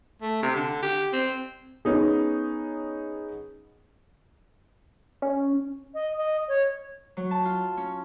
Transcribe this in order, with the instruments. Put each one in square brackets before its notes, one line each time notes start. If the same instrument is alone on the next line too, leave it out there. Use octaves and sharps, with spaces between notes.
[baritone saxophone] A3
C3
D3
G4
C4
[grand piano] B3 C#4 D#4 G#4
[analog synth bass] C#4
[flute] D#5
D#5
C#5
[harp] F#3
A5
F4
C#4